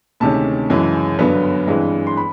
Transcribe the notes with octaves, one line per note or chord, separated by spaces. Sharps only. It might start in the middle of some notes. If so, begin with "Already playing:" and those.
D2 C3 D#3 G#3 C#4 A5
F#2 C#3 E3 G#3
G1 G2 D3 F#3 B3
G2 E3 G#3 C4
C6
B5